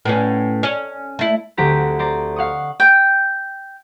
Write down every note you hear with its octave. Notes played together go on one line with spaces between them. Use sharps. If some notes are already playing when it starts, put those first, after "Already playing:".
A2 B3 C#4
C#4
A3 E4
D2 C4 G4 F#5 A#5 B6
C5 D5 A#5
F5 F#5 C#6 D#6
G5